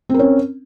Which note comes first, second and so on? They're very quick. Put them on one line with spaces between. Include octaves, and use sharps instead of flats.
C4 A#4 C#4